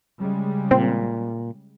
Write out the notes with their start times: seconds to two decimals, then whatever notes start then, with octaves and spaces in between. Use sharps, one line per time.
0.20 C#3 G3 G#3
0.71 A#2 C4